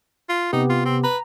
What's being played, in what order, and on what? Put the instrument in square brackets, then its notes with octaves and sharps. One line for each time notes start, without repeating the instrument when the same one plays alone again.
[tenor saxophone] F4
[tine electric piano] C3 B3 G4 [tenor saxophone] D#4
[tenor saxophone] F4
C4
[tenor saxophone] B4 [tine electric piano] A#5